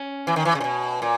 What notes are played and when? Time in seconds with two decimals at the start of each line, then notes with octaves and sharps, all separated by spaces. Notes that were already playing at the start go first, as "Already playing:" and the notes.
Already playing: C#4
0.27 E3
0.36 D#3
0.45 E3
0.55 C#3
0.60 A#2
0.64 B2
1.02 A#2